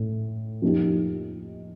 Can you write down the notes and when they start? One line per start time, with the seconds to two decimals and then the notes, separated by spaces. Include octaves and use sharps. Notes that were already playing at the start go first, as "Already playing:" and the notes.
Already playing: A2 A3
0.62 F3 A#3 D#4 G4